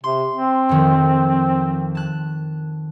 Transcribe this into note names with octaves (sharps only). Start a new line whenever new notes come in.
C3 C6
C4
F2 D#3 F3
A5 F#6